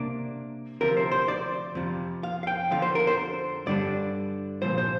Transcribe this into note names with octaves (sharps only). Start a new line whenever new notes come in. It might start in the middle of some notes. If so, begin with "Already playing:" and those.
Already playing: C3 A#3 D4 D5
D2 C3 F3 A#4
C5
C5
D5
F2 C3 F3
F5
F5
G5
F2 D3 F3 F5
C5
A#4
C5
G2 D3 G3 D4 D5
C2 A#2 F3 C5
C5